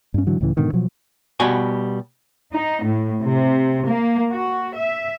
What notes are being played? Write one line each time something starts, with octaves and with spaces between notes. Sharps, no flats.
G2 C#4
G#2 D3 E3 F#3
C#2 A2 C#3 E3
G#2 B2 D3 D#3
B2 F3 F#3
B2 G3 F#4 G#5
D#4
A2
C3
A#3
F#4
E5